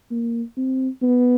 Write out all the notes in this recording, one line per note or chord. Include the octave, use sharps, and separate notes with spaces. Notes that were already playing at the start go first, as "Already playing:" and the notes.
A#3
C4
B3